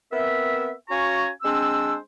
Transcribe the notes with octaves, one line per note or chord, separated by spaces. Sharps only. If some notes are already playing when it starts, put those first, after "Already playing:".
B3 C4 A#4 E5
C#4 F#4 F5 G#5 A#5 C#6
G#3 C4 D4 C5 E6